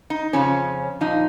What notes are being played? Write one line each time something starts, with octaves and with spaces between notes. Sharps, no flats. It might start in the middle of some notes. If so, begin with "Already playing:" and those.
D#4
F2 C#3 F3 C#4
A#2 F3 D#4